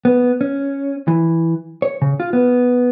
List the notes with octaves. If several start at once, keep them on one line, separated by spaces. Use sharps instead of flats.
B3
C#4
E3
C#5
C#3
F4
B3